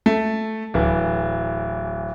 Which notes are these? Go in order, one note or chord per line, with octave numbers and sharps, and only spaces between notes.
A3
D1 E3